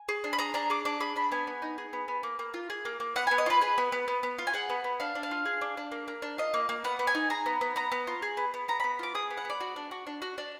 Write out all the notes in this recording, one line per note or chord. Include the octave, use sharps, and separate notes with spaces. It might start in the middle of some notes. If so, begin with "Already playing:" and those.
Already playing: G#5
G#4
D4
B5
G#4 A#5
D4 A#5
G#4 D6
D4 D6
G#4 B5
D4 B5
B3 G#5
B3
D#4
G#4
B3
B3
A#3
A#3
F4
G#4
A#3
A#3
B3 F#5
B3 G#5
D#5
F4 B4
G#4 B4
B3
B3
B3
B3
F4
G#5
G#4 F#5
B3
B3
D4 F5
D4
F5
F4
G#4
D4
D4
A#3
A#3
D4
F4 D#5
A#3
A#3
B3 F#5
B3
G#5
D#4
G#4 A#5
B3
B3
B3 A#5
B3
F4
G#4
B3
B3
B3 A#5
B3 B5
F4 D6
G#4 D#6
B3
F#5
B3 D5
F#4
D4
F#4
D4
F#4
D4